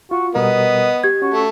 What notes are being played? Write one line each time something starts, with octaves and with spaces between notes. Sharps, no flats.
F4 F#4
B2 G3 B3 A#4 D#5
G4 G#6
C#4 F#4
A3